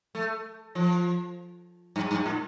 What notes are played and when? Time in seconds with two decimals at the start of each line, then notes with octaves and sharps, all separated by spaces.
0.15 A3
0.75 F3
1.96 G2
2.11 G2
2.26 A2